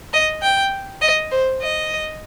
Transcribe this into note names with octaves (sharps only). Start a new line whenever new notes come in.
D#5
G5
D#5
C5
D#5